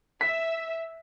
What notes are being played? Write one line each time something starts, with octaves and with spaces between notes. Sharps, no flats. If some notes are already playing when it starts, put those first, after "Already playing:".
E5 B6